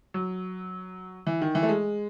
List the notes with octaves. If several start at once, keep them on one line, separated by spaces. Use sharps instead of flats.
F#3
E3
D#3
E3
A3
G#3